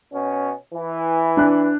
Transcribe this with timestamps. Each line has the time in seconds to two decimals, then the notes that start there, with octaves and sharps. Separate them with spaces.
0.12 B2 C#4
0.73 E3
1.37 D4 F#6